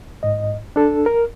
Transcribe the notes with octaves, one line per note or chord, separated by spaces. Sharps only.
G#2 D#5
D4 A4
A#4